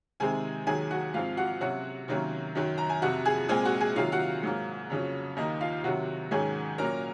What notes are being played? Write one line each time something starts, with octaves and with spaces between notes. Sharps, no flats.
C3 D#3 G#3 C4 G#4 G#5
D#2 D#3 F#3 G#4 G#5
F#4 F#5
G#2 F3 C4 F4 F5
F#4 F#5
C3 F#3 C#4 F#4 F#5
C3 D#3 F#3 A#3 C#4
F#2 D#3 F#3
A#5
G#5
F2 C3 F3 F#4 F#5
G#4 G#5
A#2 G#3 C4 G#4 G#5
F#4 F#5
G#4 G#5
C3 D#3 F#3 F4 F5
F#4 F#5
G#2 F#3 A#3
F2 C#3 F#3 C#4
D#2 D#3 A#3 D#4 D#5
F4 F5
C3 D#3 F#3 F#4 F#5
G#2 D#3 F#3 C#4 G#4 G#5
A#2 F#3 C#4 A#4 A#5